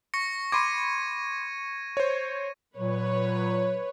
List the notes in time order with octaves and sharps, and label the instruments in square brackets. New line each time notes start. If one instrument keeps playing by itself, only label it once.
[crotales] C#6 A#6 C#7
[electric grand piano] B5 C6 D6 [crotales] G#6 D#7
[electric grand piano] C5 C#5
[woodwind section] A#2 F#3 [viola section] B4 C#5